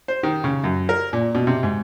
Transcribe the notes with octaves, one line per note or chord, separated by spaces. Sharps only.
C5
D#3
C#3
F#2
A#4
A#2
B2
C3
G#2